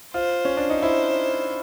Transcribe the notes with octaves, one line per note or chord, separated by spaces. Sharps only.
F4 C5
C#4
D4
D#4
E4 C5